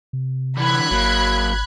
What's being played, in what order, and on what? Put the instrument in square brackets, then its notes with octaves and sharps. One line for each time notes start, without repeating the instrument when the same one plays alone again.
[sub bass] C3
[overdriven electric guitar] D3 E3 [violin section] B5 F#6 G#6
[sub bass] G#1 [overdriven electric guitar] F#3 A#3